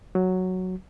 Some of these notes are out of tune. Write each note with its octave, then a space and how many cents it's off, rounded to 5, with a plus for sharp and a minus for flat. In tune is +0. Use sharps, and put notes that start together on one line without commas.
F#3 +0